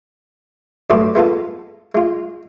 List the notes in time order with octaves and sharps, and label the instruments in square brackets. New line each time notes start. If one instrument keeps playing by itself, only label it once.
[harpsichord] G2 F#3 A3 A4 C6 D6
G#3 B3 F4 A4
G#3 F4